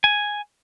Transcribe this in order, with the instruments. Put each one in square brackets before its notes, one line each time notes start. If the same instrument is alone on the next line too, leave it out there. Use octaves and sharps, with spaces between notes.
[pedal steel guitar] G#5